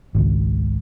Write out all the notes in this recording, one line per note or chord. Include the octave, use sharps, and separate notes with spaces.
G#1 C#2